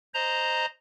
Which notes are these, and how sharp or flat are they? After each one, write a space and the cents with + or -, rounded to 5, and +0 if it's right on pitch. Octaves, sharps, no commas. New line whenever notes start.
C5 +0 D#5 -10 A#5 +0